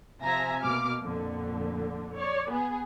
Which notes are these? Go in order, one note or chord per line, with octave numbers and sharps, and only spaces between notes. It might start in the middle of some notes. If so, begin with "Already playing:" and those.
C3 F3 E5 G#5 A#5 A#6
B2 A#3 D6 F6
F2 A#2 D3
C#5 D5
B3 G#4